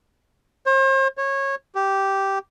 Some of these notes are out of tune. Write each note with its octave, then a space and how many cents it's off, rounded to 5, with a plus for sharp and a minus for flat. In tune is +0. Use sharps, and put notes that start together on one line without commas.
C5 +45
C#5 -20
G4 -10